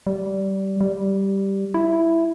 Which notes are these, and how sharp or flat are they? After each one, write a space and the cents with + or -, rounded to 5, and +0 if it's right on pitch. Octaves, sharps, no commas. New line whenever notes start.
G3 -20
G3 -5
E4 +5